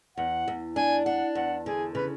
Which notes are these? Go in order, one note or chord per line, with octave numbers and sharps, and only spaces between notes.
E2 F#5
E2
D4 G#5
D4 F#5
E2 F#5
D3 G#4
C#3 B4